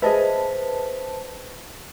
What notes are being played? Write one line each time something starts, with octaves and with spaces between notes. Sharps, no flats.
G#4 B4 C5 D#5 E5 A5 B6